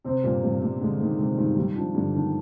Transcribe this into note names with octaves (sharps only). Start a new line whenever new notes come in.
C3 C4
G2 A#2
G2 C3
G2 C3
D3 G#3
D#3 G#3
C3 G#3
G2 D#3
D#3 G3
F3 D4
G2 D3
D#3 D4